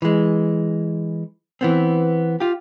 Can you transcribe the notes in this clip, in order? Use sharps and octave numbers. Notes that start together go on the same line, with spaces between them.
E3 G#3
E3 B3 C4
F4 G4